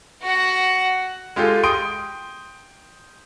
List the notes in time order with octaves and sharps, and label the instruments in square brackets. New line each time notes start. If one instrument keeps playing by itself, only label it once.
[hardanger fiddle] F#4 F#5
[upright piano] G#3 F4 G4 A4
G5 C6 D#6 D7